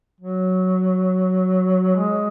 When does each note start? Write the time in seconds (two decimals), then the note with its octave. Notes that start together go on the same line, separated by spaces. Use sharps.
0.21 F#3
1.96 G#3